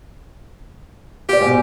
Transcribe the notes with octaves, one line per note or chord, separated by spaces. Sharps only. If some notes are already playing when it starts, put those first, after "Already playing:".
F4 G4 D5
G#2 B2